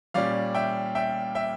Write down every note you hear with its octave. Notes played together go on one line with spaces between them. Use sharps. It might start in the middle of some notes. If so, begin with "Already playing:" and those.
A#2 G3 C#4 D5 F5
E5 G5
E5 G5
E5 G5